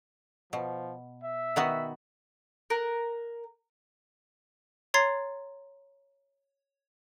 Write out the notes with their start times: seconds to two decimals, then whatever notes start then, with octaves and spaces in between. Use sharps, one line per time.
0.53 B2 F3
1.23 E5
1.56 D#3 B3 F#4
2.70 A#4 F#6
4.94 C#5 A#5 C6 G#6 A6 C7